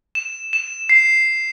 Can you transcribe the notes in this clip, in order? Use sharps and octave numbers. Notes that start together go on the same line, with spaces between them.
E7
E7
C7